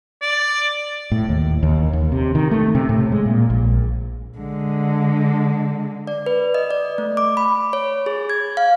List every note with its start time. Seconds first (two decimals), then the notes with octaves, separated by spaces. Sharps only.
0.22 D5
1.12 A2
1.29 D#2
1.63 D#2
1.93 D#2
2.12 C3
2.35 D#3
2.51 A3
2.75 C3
2.89 A2
3.12 G#3
3.26 A#2
3.50 A#1
4.38 D3 G#3
6.07 D5
6.26 B4
6.54 D#5
6.71 D5
6.98 A3
7.17 D6
7.37 B5
7.73 C#5
8.06 G#4
8.30 G#6
8.57 F5